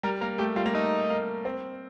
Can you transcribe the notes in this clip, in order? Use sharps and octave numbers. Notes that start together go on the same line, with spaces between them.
G3 A#4
A#3 A#4
A3 G4
G3 F4
A#3
A3 D#4
A#3
C4